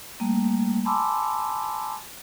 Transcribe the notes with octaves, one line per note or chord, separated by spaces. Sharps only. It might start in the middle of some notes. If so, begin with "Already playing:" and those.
G3 A3 A#3
G#5 A5 B5 C6 D6 E6